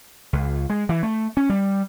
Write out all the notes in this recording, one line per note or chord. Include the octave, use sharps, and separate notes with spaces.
C#2
G#3
E3
A3
C#4
G3